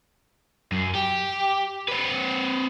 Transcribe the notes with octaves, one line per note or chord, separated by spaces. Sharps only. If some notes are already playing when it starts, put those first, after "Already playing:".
F#2
G4
C4 B4